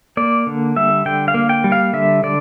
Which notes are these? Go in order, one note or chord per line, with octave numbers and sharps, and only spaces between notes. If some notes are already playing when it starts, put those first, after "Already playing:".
A#3 D5
D3
G3 E5
D3 G5
F5
A#3
G5
G3
F5
D3 E5
D3 D5